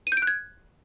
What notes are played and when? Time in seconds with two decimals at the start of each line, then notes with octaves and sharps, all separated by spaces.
0.07 D#7
0.12 G6
0.17 D7
0.22 F#6
0.27 G#6